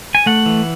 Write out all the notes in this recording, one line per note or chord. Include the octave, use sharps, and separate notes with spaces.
G#5
A3 F#5
E3